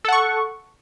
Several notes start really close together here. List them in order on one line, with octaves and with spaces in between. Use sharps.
A4 F#5 C#6